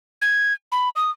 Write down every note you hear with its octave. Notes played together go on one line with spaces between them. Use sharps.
G#6
B5
D#6